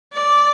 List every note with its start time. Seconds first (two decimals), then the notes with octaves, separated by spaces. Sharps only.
0.13 D5